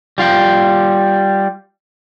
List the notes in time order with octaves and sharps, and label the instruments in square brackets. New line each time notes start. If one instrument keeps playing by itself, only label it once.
[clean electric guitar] G3 F4 F5 G5